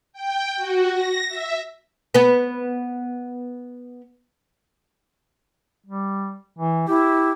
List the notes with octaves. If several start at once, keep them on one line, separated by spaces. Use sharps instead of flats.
G5
F#4
A#6
E5
B3 B4
G3
E3
E4 G4